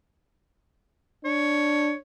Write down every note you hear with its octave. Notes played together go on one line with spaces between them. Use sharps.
D4 C#5